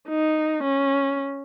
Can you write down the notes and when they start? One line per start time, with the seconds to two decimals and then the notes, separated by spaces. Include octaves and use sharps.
0.09 D#4
0.63 C#4